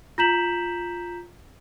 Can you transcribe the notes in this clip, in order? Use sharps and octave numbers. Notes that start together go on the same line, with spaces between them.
F4 A#5 G6 B6 E7 F#7